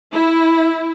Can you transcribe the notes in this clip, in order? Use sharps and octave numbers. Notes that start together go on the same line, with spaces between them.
E4